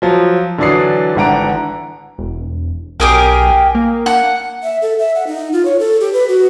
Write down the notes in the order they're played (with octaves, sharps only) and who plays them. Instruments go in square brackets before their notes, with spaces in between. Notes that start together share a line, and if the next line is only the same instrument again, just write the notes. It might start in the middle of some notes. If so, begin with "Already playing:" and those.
[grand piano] F3 F#3
D3 E3 F#3 D5 D#6 C7
G#1 D3 E3 F#5 A#5 D7
[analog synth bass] E1
[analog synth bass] B1 [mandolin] G4 G#4 A#4
[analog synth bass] A#3
[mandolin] F#5
[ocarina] E5
A4
E5
F#5
D#4
F4
C#5
A4
G4
B4
F#4